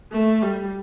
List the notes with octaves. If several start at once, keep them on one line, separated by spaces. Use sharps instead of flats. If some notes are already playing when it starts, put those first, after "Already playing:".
A3
G3